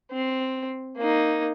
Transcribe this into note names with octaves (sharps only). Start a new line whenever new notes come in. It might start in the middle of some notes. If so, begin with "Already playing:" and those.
C4
A#3 D#4